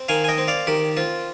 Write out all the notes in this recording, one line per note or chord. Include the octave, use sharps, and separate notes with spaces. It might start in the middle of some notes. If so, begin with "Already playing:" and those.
Already playing: C4
D#3 F5 G#5
G#5
D#5 G5
C4
D5 F5
D#3 G4
C4 F4